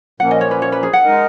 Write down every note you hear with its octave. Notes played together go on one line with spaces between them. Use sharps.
A#2 F3 A#3 C#4 F#5
D#5
C#5
B4
C#5
B4
G#4
F#5
G#3 D#4 A#4 D#5